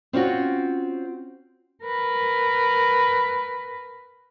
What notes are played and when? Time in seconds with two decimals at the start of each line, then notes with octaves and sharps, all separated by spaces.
0.13 C4 C#4 F4 F#4
1.84 A#4 B4